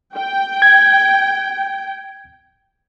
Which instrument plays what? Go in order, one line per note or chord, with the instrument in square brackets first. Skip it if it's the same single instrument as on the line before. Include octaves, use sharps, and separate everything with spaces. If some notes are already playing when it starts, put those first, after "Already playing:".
[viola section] G5
[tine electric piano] G#6